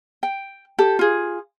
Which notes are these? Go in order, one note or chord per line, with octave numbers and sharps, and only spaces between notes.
G5
G4 A4
F4 G#4